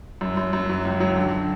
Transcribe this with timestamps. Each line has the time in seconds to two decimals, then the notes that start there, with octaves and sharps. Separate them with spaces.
0.21 F#2
0.37 F#2
0.53 F#2
0.69 F#3
0.85 C#2
1.00 F#3
1.16 D3